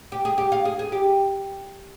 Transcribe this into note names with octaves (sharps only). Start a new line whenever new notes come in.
G4
G#4
G4
F4
G#4
G#4
G4